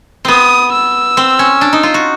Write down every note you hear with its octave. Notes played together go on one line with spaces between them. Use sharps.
B3 C4 D#6
E6
C4
C#4
D4
D#4
F4
F#4